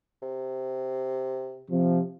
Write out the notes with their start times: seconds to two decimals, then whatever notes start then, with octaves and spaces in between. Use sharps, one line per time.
0.22 C3
1.69 C3 F3